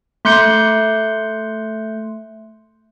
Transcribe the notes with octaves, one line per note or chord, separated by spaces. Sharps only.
A3 C6 F#6 G6 C#7